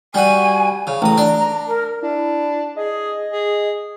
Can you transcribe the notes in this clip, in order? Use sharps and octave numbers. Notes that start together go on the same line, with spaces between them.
G3 F#4 G#5
C#3
A1 A#5 D#6
D4
A#4
D4 E4
G#4 D#5
G#4